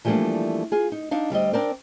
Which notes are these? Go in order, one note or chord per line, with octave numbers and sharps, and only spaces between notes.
E3 F3 G3 A3 A#3 D4
F4 G#4
D#4
D4 D#4 F5
D2 G3 C4 D#5
C4 D4 A#4 C5 D5